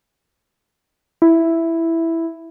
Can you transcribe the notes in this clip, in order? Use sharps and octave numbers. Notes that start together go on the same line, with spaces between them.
E4